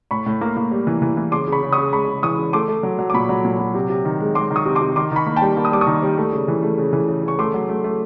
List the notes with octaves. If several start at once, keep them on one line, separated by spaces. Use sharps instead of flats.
A2 B5 C#6
A2
A#3
A#3
G3
E3
E3
E3
C#3 C6 D6
C#3 B5 C#6
C#3
C#6 D#6
C#3
G#3 B5 C#6
C#3
E3 C#6 D#6
C#3
A3 C6 D6
A3
F#3
F#3
D6
A#2 B5 C#6
F#3
A#2
F#3
C3
C3
D#3
G#3
G#3 C6 D6
D#3
C#6 D#6
C3
C6 D6
C3
D#3 C6 D6
D#3 B5 C#6
A#3
G5 A5
G3
A#3
D#6
G3 D6
C#6 D#6
D#3
G3
A3
C#3
E3
A3
C#3
E3
C#3
C#3 C#6
A3 C6 D6
F#3
A3
A3